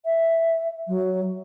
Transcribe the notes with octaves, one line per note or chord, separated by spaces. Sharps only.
E5
F#3